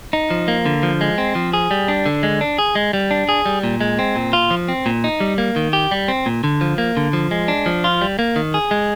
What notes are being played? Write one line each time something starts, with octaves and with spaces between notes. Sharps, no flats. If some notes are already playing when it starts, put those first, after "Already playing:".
D#4
F3
A#3
D3
F3
G#3
C4
F3
G#4
G3
D4
D3
G#3
D4
G#4
G#3
G3
D4
G#4
G3
A#2
G#3
C4
A#2
F4
F3
C4
A#2
D#4
G3
A#3
D#3
G4
G3
C4
A#2
D3
F3
A#3
D3
F3
G#3
D4
F3
F4
G3
A#3
D#3
G#4
G#3